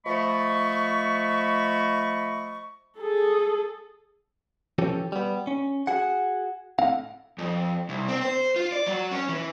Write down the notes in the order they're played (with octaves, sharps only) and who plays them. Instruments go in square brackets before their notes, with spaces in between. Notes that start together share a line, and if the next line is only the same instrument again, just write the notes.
[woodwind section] F3 A3 D#5 B5 C#6
[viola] G#4 A4
[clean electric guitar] E3 F3 C#4 G4 A4
G3 B3
C#4
F#4 G#4 F#5
A2 C4 F5 F#5
[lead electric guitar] F2
C2
C4
C5
F4
D5
F#3
C#4
E3